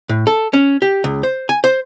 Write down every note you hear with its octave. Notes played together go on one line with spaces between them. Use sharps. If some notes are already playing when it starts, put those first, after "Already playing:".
A2
A4
C#4
G4
C#2
C5
G#5
C5